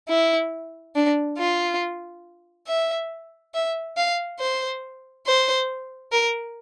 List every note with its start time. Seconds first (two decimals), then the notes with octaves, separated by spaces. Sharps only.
0.09 E4
0.95 D4
1.38 F4
2.67 E5
3.54 E5
3.97 F5
4.39 C5
5.26 C5
6.12 A#4